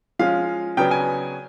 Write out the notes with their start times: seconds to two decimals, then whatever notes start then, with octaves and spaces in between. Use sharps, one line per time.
0.19 F3 G#3 C#4 F5
0.77 C#3 F#3 B3 D4 G5
0.91 G#5